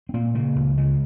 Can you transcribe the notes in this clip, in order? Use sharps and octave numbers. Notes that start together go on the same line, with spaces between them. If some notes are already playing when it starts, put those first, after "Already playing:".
C4
A#2 A#3
C#3 A#3
C#2
C#3 G#3